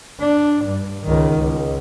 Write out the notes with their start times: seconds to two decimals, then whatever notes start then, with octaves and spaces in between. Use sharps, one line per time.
0.20 D4
0.64 G2
1.05 C#2 D#3
1.39 C#2